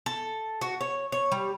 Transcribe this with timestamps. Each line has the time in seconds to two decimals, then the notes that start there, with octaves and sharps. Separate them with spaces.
0.06 A4
0.61 F#4
0.81 C#5
1.12 C#5
1.32 G3